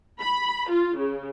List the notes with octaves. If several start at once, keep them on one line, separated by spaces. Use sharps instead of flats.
B5
F4
C#3